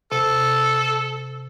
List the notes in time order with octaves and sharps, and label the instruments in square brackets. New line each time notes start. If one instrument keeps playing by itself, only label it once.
[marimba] C3 [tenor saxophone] A4